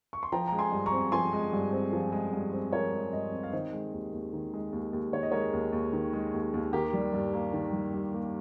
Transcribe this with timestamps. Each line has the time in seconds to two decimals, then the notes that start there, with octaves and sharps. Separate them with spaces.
0.13 C#6
0.23 C6
0.32 F3 G5 A#5
0.48 G#3 A#5
0.59 G#5 C6
0.72 G2
0.86 A#5 C#6
0.92 C4
1.12 F3 G#5 C6
1.33 G#3
1.53 G2
1.72 C4
1.93 F3
2.12 G#3
2.33 G2
2.52 C4
2.72 F3 A#4 C#5
2.93 G#3
3.13 G2 C5 D#5
3.32 C4
3.43 F5
3.53 D#3 C5 D#5
3.73 G#3
3.93 D#2
4.12 D#2
4.33 D#3
4.53 G#3
4.73 D#2
4.93 D#2
5.13 D#3 C#5
5.23 D#5
5.32 G#3 A#4 C#5
5.53 D#2
5.72 D#2
5.93 D#3
6.13 G#3
6.33 D#2
6.54 D#2
6.73 D#3 G4 A#4
6.94 G3
7.13 G2
7.34 A#3
7.53 D#3
7.73 G3
7.93 G2
8.14 A#3